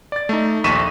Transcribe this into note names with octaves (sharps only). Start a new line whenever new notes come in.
D5 A6
A3 D#4
A#1 D#2 C#6 B6 D#7 E7